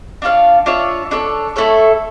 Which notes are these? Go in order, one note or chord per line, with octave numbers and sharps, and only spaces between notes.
D4 F4 C#5 F5
D4 F4 C#5 E5
D4 A4 C#5
A3 E4 A4 C#5